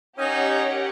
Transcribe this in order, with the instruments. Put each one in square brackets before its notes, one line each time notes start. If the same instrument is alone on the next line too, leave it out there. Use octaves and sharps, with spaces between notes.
[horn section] C#4 D#4 [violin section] G4 A#4 C#5 F#5